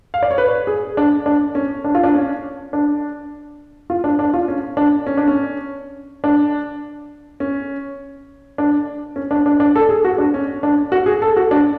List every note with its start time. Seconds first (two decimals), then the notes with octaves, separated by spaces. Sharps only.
0.14 F5
0.23 D5
0.31 C#5
0.38 B4
0.67 G#4
0.97 D4
1.26 D4
1.55 C#4
1.84 D4
1.95 F4
2.03 D4
2.15 C#4
2.73 D4
3.90 F4
4.04 D4
4.19 D4
4.34 F4
4.48 C#4
4.77 D4
5.07 C#4
5.17 D4
5.28 C#4
6.24 D4
7.40 C#4
8.58 D4
9.16 C#4
9.31 D4
9.46 D4
9.60 D4
9.76 A4
9.89 G#4
10.04 F#4
10.18 D4
10.34 C#4
10.63 D4
10.92 F#4
11.06 G#4
11.22 A4
11.37 F#4
11.51 D4